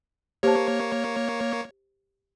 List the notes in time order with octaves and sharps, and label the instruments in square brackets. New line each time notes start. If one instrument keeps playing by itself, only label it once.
[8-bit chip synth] A#3 C#5 [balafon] G4 C5 A5